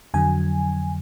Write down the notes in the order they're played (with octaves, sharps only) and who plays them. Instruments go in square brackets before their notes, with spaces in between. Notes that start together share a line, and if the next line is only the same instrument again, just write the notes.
[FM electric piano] F2 D3 F#3 G#5